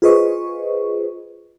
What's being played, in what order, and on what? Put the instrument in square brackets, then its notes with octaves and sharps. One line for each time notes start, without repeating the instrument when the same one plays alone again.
[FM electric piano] F4 G#4 B4 C5 D#5 C#6